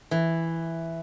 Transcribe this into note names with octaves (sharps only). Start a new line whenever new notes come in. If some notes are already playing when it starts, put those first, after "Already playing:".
E3